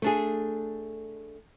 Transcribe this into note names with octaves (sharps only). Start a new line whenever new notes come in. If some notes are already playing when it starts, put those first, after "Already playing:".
A3 D4 G#4